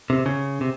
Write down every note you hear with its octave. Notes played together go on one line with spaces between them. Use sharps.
C3
C#3
C3